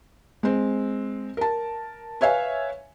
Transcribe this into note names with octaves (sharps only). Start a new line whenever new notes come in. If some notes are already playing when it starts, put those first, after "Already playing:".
G#3 C4
A#4 A5
B4 C#5 E5 F5 G#5